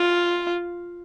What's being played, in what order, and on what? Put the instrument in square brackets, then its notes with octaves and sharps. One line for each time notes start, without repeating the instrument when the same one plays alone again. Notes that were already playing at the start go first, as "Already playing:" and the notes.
Already playing: [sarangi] F4